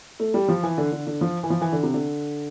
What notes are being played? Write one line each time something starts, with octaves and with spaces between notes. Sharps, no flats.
A3
G3
F3
E3
D3
D3
D3
F3
E3
F3
E3
D3
C3
D3